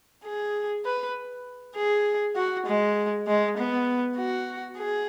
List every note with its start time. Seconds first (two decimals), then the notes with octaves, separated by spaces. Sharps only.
0.24 G#4
0.85 B4
1.76 G#4
2.36 F#4
2.66 G#3
3.27 G#3
3.58 B3
4.17 F#4
4.78 G#4